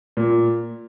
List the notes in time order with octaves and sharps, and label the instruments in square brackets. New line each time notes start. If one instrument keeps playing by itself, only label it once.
[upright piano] A#2